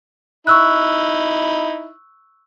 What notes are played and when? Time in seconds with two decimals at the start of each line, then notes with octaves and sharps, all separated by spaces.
0.47 D#4 E4 C#6 E6 F#6